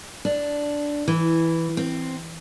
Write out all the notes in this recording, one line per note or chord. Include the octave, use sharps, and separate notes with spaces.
D4
E3
C4